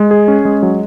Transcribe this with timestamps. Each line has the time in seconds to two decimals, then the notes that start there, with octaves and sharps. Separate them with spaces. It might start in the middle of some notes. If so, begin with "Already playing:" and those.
Already playing: G#3
0.11 G#4
0.28 C#4
0.45 G#3
0.63 F#3